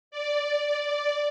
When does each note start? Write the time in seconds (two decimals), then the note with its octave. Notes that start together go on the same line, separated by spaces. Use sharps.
0.11 D5